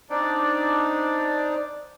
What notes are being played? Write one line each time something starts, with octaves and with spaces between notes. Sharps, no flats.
C4 D4 D#4 D5